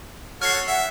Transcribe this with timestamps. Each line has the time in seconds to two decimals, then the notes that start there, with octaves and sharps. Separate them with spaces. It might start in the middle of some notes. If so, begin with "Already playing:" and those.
0.42 F#4 A4 C#5 F6 C7
0.68 E5 F#5